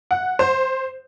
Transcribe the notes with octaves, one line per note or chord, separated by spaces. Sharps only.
F#5
C5